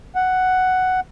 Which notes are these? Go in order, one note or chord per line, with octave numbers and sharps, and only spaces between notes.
F#5